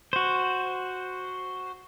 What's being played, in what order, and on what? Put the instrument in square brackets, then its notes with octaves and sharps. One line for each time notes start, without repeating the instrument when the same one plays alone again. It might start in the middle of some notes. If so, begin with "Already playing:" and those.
[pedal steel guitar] F#4 C5